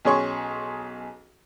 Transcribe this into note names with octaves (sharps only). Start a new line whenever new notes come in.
B1 C#4 G#4 C#5 C6 C#6